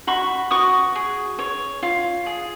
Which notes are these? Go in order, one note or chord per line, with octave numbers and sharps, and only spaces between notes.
F#4 B5 C#6
F#4 C#6 D#6
G#4
C#5
F4
G#4